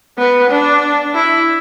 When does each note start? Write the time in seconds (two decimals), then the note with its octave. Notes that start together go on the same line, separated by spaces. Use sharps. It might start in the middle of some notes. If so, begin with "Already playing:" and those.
0.18 B3
0.50 D4
1.14 E4